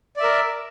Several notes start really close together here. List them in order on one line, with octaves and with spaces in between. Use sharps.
D5 E5 A#4